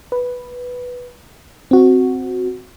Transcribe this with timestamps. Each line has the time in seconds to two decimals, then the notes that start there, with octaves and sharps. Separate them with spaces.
0.12 B4
1.71 C4 F#4